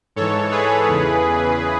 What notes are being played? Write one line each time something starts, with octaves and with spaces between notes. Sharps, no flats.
G#2 E3 A4 C#5
G#4 B4
E2 C#3 E3